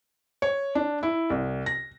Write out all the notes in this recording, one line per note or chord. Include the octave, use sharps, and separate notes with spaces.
C#5
D4
E4
C2
A#6